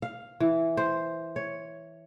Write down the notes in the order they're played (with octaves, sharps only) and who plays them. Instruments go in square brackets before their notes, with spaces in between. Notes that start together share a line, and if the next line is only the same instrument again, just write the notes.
[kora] F5
E3
C5
C#5